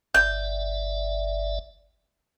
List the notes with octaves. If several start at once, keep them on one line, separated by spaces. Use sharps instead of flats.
G1 D5 E5 G6